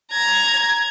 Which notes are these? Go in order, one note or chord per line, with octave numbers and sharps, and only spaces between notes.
A#5 G#6